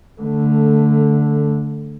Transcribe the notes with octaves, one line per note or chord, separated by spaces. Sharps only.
D3 A3